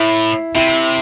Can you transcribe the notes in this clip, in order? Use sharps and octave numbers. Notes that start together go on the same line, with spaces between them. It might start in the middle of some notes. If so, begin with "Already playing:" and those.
Already playing: A2 E4
C3 E4